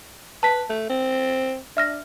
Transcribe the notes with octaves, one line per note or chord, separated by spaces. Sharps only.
B4 A5 B6
A3
C4
D4 E5 F6 A#6